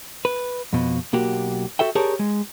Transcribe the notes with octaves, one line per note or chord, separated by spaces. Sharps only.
B4
F2 B2
B1 A#3 F#4 G4
F#4 A4 E5 G5
G4 G#4 A#4 C#5 D5 A5
G#3